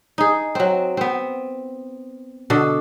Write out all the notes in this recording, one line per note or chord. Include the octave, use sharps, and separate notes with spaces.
D#4 G#4
F#3 C4
B3 C4
B2 D3 A4